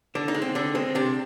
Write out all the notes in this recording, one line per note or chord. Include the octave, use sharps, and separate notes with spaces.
D3 D4
D#4
G#3
C4
D3 D4
G#3 C4
C3 D4